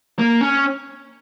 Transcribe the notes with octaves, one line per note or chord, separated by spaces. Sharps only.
A#3
C#4